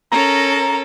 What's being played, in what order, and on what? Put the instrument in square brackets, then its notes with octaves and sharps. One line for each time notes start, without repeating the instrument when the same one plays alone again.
[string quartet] C#4 A4 A#4 [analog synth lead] A#5